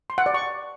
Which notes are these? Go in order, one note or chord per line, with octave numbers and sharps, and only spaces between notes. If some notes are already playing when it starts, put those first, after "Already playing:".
C6
F#5
D5
C#6